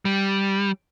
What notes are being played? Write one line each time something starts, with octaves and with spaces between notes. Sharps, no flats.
G3